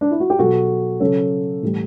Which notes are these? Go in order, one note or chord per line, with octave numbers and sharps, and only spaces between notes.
D4
E4
F#4
G4
B2 F#3 F#4 A4
C#3 F#3 A4 C#5
A2 E3 G3